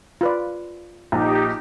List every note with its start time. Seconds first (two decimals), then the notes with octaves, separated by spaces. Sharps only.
0.21 F4 B4 D5
1.12 A#1 D#4 G4